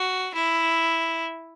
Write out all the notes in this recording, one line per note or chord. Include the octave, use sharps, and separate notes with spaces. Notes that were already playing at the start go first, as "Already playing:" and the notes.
Already playing: F#4
E4